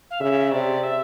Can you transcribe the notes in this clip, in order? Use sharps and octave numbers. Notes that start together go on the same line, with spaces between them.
F5
C#3 E5
C3 D5
E5